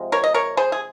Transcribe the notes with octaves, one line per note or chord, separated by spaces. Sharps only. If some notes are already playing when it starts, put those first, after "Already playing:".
Already playing: C3 F3 G#3
A#4 C#5
D#5
A#4 C#5
G#4 C5
G#4